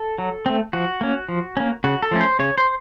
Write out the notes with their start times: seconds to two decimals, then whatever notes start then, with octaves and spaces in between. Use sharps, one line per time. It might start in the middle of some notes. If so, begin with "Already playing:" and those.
Already playing: A4
0.18 F#3
0.46 A3 C4
0.73 F3 F#4
1.01 A#3 C#4
1.29 F3
1.57 A#3 C#4
1.84 C#3 F#4
2.02 A4
2.11 F3 A3 C#4
2.21 C5
2.39 C#3 C#5
2.58 C5